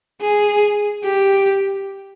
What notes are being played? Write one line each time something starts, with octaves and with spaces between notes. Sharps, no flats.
G#4
G4